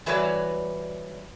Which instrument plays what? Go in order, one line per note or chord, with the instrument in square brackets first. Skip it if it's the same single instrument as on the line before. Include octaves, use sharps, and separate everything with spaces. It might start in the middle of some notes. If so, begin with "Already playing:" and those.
[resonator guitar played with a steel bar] E3 G3 F#4 B4 C#5 D5